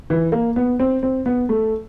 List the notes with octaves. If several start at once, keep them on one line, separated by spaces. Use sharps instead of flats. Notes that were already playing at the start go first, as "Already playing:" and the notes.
E3
A#3
B3
C4
C4
B3
A3